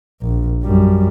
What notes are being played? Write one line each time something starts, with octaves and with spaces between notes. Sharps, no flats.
A#1
F#2 G3